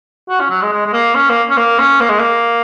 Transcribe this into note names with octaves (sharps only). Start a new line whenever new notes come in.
F#4
C#4
F#3
G#3
G#3
G#3
A#3
C#4
A#3
C#4
A#3
C#4
A#3
G#3
A#3